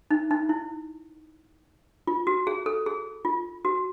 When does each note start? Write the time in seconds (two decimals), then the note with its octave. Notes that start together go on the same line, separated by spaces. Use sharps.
0.11 D#4
0.31 D#4
0.49 E4
2.07 F4
2.27 F#4
2.47 G#4
2.66 A4
2.86 G#4
3.25 F4
3.65 F#4